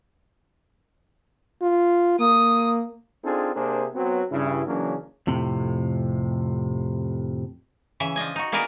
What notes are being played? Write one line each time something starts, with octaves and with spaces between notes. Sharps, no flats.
F4
A#3 D#6
C4 D4 D#4 F4 G#4 A4
C3 A#3 D4 G#4 A#4 C5
F#3 B3 C4
G2 C#3 E4
C#3 E3 F#3 A#3 C#4 D4
F2 A2 C3
C#3 E3 E5
F3 D4 D#5 G#5
D#4 F#4
A#3 B3 D4 G#4 A#4 B4